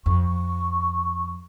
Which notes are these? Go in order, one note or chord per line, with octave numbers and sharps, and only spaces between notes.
F2 C#6